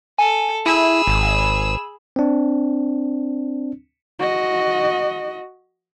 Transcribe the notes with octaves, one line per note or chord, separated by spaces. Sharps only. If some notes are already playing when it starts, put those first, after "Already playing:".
A4 G#5
E4 G#4 B5 E6
G#1
C4 D4
F#4 D#5